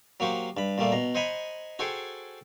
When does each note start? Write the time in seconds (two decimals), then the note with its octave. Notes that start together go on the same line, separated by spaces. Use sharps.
0.20 F#3 A#3 F#4 G4 C5
0.57 G2 B5
0.78 A#2 G3 A3 A#3
0.92 B2 A#5
1.15 C5 D#5 F#5 G#5 A#5 B5
1.79 F#4 G#4 A4 C5 C#5 G5